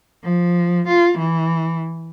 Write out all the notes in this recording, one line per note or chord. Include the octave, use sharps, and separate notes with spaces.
F3
F4
E3